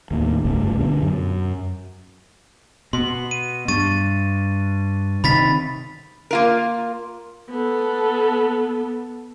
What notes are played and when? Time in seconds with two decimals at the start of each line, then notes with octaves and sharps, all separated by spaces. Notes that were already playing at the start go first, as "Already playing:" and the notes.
0.11 D#2 A2
0.45 F#1 C#2 G2 A3
0.80 B2 D3
1.02 F#2
2.93 B2 C6
3.31 D#7
3.68 G2 C#6 A6 D#7
5.24 C3 D#3 B5 A6 B6
6.31 A#3 F4 A#4
7.50 B3 A4